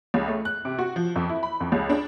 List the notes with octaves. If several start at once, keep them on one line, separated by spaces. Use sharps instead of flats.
C#2
A3
F#6
C3
F#4
F3
F2
E4
B5
F2
C#2
D4